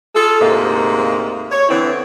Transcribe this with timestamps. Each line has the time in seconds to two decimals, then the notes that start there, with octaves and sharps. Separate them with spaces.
0.15 F4 G#4 A4
0.41 D2 G#2 C3 A#3
1.51 C#5
1.69 D3 E3 B3 C4 E4